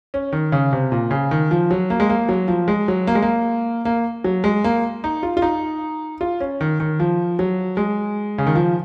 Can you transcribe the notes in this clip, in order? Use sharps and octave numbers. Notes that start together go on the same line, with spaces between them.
C#4
D#3
C#3
C3
A#2
C#3
D#3
F3
F#3
A#3
G#3
A#3
F#3
F3
G#3
F#3
A#3
G#3
A#3
A#3
F#3
G#3
A#3
D#4
F4
F4
D#4
F4
C#4
D#3
D#3
F3
F#3
G#3
C#3
D#3
F3